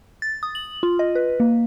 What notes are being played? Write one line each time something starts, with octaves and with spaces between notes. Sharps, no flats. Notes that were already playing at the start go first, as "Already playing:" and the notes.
A6
D#6
F#7
F4
D#5
B4
A#3